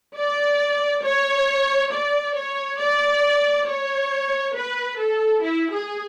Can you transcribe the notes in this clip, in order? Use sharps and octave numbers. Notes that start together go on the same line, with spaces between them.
D5
C#5
D5
C#5
D5
C#5
B4
A4
E4
G#4